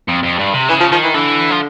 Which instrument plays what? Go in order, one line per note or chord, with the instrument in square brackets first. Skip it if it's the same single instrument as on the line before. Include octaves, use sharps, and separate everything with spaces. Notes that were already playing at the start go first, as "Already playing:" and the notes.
[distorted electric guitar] F2
F2
G2
C3
[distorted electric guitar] C#3 [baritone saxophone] E3
[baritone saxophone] F3
[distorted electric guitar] D#3 [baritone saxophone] F3
[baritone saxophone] E3
[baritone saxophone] D3 [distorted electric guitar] E3
[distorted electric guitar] F3